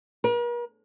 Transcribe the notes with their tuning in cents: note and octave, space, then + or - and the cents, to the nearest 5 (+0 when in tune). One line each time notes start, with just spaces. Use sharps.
A#4 +45